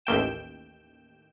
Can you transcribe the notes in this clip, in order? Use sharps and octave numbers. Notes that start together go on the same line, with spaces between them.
A1 D#2 G5 E7